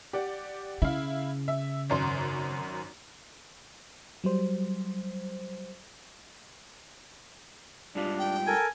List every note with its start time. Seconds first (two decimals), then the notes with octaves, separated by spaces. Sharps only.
0.13 G4 D5 F#5
0.82 C#3 E4 F5
1.48 E5
1.90 G#1 F#2 C6
4.24 F#3 G3 C5
7.95 G#2 G3 D4 F4
8.19 G5
8.47 A4 A#4 G#5